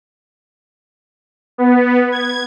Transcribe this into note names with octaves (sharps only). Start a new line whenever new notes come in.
B3
G#6